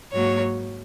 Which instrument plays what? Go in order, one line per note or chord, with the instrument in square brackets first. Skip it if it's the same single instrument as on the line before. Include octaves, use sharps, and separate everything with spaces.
[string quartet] G#2 F#3 A#3 C#5